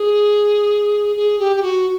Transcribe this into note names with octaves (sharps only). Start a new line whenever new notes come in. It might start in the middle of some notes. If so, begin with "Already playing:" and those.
Already playing: G#4
G#4
G4
G4
F#4